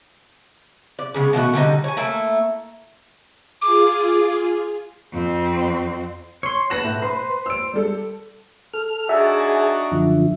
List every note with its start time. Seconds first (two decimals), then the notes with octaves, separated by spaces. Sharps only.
0.99 D5
1.14 C#3 G#3 B3
1.33 B2 D#3 A3 F#4
1.54 D3 G3 D#4 D#5
1.84 C#5 G#5
1.97 A3 A#3 E4
3.61 F4 G#4 D6
5.12 F2 C4
6.43 C#5 C6
6.70 B4 F#5 A5 A#6 E7
6.84 A2
7.02 B4 C5 B5 C6
7.46 E6 D7
7.73 G3 A4
8.73 A4 F6
9.09 D4 D#4 F#4 G#4 E5 G#5 A5
9.91 F#2 D3 F3